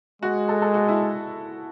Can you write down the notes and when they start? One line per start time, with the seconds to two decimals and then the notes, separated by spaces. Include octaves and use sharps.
0.22 G#3 F#4
0.49 A4
0.62 A4
0.74 F#4
0.88 E4